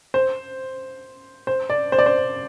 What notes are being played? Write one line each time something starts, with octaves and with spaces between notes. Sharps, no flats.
C5
C5
D5
C5
D5
C5